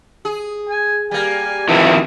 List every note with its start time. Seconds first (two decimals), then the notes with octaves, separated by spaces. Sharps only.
0.25 G#4
0.69 G#5
1.11 G3 A#3 G#5
1.69 F2 B2 D#3 E3 E4